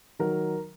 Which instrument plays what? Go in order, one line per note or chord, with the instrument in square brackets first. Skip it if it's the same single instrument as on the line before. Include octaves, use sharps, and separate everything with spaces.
[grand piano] D#3 F#3 A#4 A#5